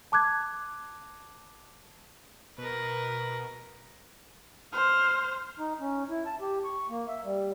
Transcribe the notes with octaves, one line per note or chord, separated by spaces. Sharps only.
A5 D6 F#6 G#6
B2 A#4 B4
C5 F6
D#4
C#4
E4
A5
G4
C#6
A#3
E5
G3